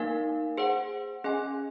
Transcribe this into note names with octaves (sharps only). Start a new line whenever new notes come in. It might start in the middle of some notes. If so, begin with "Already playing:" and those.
Already playing: A#3 D#4 A#4 F5 G#5
G#4 C5 F#5
C#4 G#4 D#5 G#5